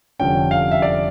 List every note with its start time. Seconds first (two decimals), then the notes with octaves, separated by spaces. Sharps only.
0.19 F1 F2 D3 G3 C#4 G5
0.51 F5
0.71 E5
0.82 D5